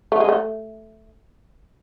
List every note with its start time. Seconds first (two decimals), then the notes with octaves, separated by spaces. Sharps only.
0.12 A3
0.20 G#3
0.29 A3